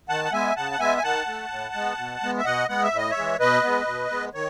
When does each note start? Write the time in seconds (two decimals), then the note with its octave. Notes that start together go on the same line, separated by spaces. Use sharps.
0.09 D#3 F#5 A5
0.25 F#5
0.32 G#3 B3 E5 G#5
0.56 C#3 F#5 A5
0.72 F#5
0.80 G#3 B3 E5 G#5
0.98 G#5
1.03 D#3 F#5 A5
1.27 A3
1.50 A2
1.75 G#3 B3
1.98 B2
2.22 G#3 B3
2.38 E5
2.45 B2 D#5 F#5
2.69 G#3 B3 F#5
2.83 E5
2.92 A2
2.97 D#5
3.10 C#5 E5
3.16 E3 G#3
3.40 B2 B4 D#5
3.63 G#3 B3
3.87 B2
4.10 G#3 B3
4.34 D#3 C#5